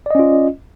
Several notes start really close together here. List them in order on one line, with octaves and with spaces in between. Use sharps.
D5 D#5 C#4 F4